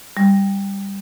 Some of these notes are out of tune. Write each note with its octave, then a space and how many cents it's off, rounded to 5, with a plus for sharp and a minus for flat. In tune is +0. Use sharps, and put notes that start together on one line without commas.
G3 +10